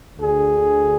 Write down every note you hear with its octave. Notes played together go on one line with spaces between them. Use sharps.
D2 D3 G#4